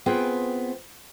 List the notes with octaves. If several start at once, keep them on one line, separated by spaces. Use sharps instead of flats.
B3 C4 F4 G#4 B4 G5